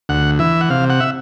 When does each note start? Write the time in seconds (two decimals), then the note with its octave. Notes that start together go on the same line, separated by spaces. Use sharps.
0.09 D2 F#5
0.39 E3 E5
0.61 F#5
0.70 C3 F5
0.90 F#5
1.00 E5